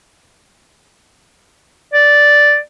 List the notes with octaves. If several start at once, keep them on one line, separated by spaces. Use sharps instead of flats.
D5